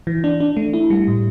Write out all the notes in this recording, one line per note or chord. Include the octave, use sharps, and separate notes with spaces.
E3
D4
D4
A3
E4
G3
A2